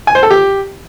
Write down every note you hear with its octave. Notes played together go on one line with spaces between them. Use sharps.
G#5
C5
A4
G4